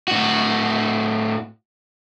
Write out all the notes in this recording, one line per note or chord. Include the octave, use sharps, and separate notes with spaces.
A2 F#4